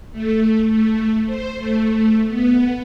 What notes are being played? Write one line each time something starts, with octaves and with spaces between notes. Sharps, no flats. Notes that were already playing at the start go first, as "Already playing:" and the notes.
A3
A3
C5
A3
B3